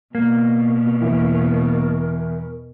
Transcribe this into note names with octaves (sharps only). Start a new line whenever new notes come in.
B2 A#3
E2 E4 A#4